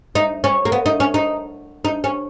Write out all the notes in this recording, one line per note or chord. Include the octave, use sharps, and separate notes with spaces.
D#4
C#4
A#3
B3
D#4
C#4
D#4
D#4
C#4